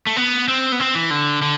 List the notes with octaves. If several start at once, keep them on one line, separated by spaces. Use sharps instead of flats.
A3
B3
C4
B3
C4
E3
D3
D3